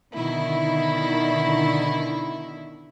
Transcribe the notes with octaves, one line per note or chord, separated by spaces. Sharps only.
B2 D3 D#3 E4